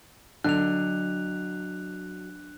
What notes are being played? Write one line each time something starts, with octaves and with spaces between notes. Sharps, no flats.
D3 F#3 D4 D#5 F#6 F7